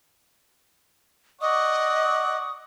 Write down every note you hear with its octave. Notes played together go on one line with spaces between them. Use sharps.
D5 D#5 F#5 C#6 D#6